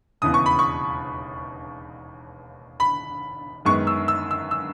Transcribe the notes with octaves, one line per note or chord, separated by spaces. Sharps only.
E1 D#2 C#3 E3 B3 D#6
C#6
B5
C#6
B5
F#2 D#3 G#3 B3 C#6
E6
E6
E6
E6